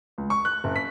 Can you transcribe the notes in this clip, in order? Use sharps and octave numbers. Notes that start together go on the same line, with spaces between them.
C#2
C#6
F#6
F#1
B6